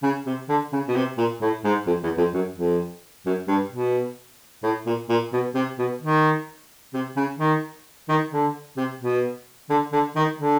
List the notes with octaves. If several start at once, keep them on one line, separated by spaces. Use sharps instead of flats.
C#3
C3
D3
C#3
B2
C3
A#2
A2
G#2
F2
E2
F2
F#2
F2
F#2
G2
B2
A2
A#2
A#2
B2
C3
B2
D#3
C3
C#3
D#3
D#3
D3
C3
B2
D3
D3
D#3
D3